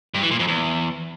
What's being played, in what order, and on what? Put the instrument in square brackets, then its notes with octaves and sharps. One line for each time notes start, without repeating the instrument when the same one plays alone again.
[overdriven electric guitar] G2
E3
A#2
F2
E2